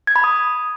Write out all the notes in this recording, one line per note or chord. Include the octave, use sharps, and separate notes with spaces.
G#6
B5
D#6